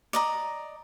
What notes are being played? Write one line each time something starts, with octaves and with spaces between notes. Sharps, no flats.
D5 D#5 A#5